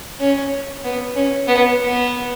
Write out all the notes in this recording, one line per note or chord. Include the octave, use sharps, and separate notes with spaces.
C#4
B3
C#4
B3
B3